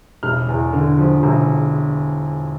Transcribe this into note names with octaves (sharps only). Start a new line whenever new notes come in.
E1 F6
E2
D3
F3
E1